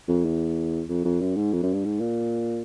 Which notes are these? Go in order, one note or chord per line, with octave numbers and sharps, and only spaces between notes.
F2
E2
F2
F2
F#2
G#2
F2
F#2
G2
G#2
A#2